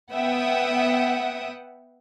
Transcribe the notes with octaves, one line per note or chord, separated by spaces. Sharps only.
B3 E5 F#5 G5 D#6